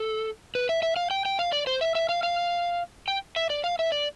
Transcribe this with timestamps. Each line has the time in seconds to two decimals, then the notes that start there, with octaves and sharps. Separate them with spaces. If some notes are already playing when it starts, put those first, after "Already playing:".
Already playing: A4
0.55 B4
0.69 E5
0.83 E5
0.96 F5
1.11 G5
1.25 G5
1.39 F5
1.53 D5
1.67 C5
1.81 E5
1.95 E5
2.09 F5
2.23 F5
3.08 G5
3.36 E5
3.50 D5
3.64 F5
3.79 E5
3.92 D5